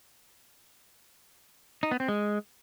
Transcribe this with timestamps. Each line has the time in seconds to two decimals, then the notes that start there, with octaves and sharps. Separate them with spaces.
1.83 D#4
1.91 B3
2.00 C4
2.08 G#3